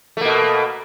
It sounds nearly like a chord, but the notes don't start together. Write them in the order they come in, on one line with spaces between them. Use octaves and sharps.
A3 A#3 B2